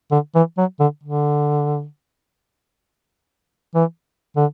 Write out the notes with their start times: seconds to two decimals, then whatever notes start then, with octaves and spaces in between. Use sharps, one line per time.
0.11 D3
0.35 E3
0.58 F#3
0.80 D3
1.03 D3
3.75 E3
4.36 D3